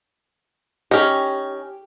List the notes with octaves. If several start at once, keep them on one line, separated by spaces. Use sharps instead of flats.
C#4 D#4 G4